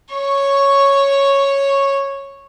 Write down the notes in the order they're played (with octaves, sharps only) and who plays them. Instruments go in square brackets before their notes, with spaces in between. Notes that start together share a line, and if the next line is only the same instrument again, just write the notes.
[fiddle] C#5 C#6